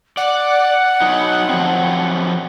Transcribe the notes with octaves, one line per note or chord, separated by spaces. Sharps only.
D5 F#5
F#3 D#4
F3 F#3 C4